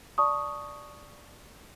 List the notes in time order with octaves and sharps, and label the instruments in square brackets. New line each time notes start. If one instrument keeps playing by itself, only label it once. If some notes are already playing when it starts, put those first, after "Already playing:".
[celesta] D5 A5 C#6 D#6